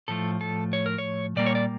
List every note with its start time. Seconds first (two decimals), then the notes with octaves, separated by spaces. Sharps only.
0.08 A2 F3 A3 A4
0.41 A4
0.73 C#5
0.86 A#4
0.98 C#5
1.36 A#2 G3 A#3 D5
1.46 C#5
1.55 D5